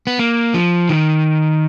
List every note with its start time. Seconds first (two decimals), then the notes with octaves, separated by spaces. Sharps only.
0.07 B3
0.19 A#3
0.54 F3
0.89 D#3